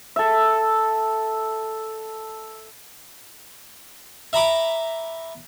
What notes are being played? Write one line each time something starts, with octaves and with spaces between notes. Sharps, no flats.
A4 E5
E5 A#5 B5 D6